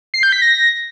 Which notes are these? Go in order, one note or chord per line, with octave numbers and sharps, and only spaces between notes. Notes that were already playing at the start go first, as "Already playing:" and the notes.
C7
G6
B6
A#6